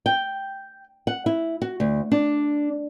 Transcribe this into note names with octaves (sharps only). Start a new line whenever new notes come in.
G5
F#5
E4
F#4
D2
D4